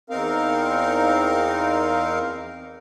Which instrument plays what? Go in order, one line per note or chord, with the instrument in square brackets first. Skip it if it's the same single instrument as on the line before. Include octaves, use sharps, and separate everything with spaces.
[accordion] E2 C4 D#4 A#4 F5